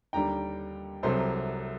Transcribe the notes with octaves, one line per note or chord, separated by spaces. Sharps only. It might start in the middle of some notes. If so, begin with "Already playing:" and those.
D#2 D3 G3 G5 A#5
C2 C3 F#3 A4 C5